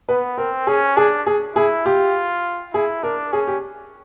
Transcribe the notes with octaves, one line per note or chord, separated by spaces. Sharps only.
B3 B4
C4 A#4
C#4 G#4
D4 G#4
G#4
E4 G#4
F4 G4
E4 G#4
D4 A#4
C#4 G#4
G4